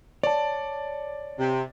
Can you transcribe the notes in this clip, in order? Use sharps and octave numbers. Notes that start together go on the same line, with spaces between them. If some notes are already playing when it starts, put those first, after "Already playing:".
C#5 D5 A5
C3